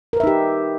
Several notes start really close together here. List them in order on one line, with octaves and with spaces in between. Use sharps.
A#4 B4 E5 D#4 G4